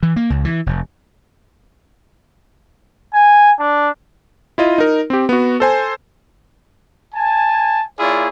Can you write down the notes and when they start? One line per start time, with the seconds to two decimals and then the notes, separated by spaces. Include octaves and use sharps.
0.03 E3
0.16 A#3
0.30 C#2
0.45 E3
0.66 F1
3.14 G#5
3.60 D4
4.58 E4 F4 D#5
4.78 D#4 A#4
5.10 C4 G4
5.29 B3 F#4
5.60 A4 C5 G#5
7.15 G#5 A5
7.99 A#3 E4 F4 G#4 C#5 D5